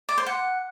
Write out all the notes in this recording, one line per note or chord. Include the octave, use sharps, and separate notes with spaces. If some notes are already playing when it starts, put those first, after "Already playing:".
D5
C5
F#5